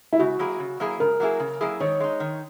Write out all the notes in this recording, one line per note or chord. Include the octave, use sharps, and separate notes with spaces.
E4
C#3 F#4
F#3 A#3 E4 G#4
C#3
F#3 A#3 E4 G#4
C#3 A#4
F#3 A#3 E4 G#4
C#3
F#3 A#3 E4 G#4
D#3 C#5
G#3 D#4
D#3